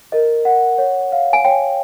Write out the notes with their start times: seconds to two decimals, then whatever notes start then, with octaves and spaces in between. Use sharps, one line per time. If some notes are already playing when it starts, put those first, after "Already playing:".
0.12 A#4 D#5
0.45 F#5
0.78 C#5
1.12 F5
1.33 G#5
1.45 C#5 G5